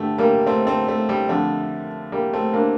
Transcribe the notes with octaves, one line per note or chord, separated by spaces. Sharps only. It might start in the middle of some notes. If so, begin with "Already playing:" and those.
Already playing: G2 D3 A3 G4
G3 A#3
A3 C4
A3 C4
A3
G3
F2 D3 A3
G3 A#3
A3 C4
A#3 D4